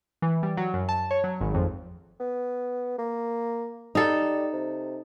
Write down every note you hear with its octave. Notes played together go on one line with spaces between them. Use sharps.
E3
G3
F#3
F#2
A5
C#5
F#3
G#1
F2
B3
A#3
G3 D#4 A4
C3